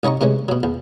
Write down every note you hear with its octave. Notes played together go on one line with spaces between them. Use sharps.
C2 C#4 D#4 A#5 C#6
C3 E3 G#3 C#4
B2 F#3
E2